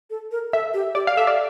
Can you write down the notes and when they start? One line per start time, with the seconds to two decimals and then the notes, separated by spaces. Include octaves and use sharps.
0.10 A4
0.32 A#4
0.53 A4 E5
0.74 G4
0.95 G4 D5
1.07 F5
1.16 A4 E5
1.27 D5